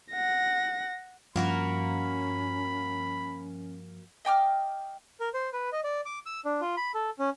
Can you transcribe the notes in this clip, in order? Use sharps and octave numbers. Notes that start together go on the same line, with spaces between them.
F#5 A#6
G2 F3 A#3 C#4 F#4 A#4 B5
D#5 G5 D6 F6
A#4
C5
B4
D#5
D5
D6
E6
D4
F4
B5
A4
C#4